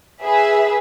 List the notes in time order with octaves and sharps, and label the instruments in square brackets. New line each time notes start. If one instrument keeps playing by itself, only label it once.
[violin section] G#4 B4 E5